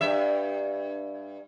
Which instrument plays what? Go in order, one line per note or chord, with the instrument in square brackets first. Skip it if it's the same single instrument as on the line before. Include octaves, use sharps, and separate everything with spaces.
[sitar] G2 E5